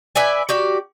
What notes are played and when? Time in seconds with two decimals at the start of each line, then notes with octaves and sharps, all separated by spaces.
0.16 B4 D5 E5 G#5
0.49 F#4 G4 D5